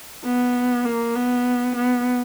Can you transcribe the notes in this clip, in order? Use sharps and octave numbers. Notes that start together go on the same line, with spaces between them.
B3
A#3
B3
B3